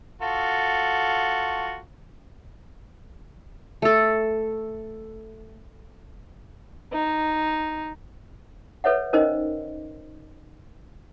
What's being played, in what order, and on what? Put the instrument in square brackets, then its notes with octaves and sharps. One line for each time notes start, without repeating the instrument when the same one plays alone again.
[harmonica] F4 F#4 A4
[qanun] A3 A4
[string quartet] D#4
[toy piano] A4 B4 C#5 E5 F#5
C#4 D#4 A#4 C5 D#5